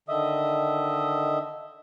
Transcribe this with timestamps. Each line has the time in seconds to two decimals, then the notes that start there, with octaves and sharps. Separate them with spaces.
0.09 D3 D#3 D#5 E5 D#6